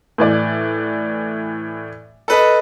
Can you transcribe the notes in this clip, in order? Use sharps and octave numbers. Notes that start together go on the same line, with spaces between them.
A2 E3 D5
A4 B4 D#5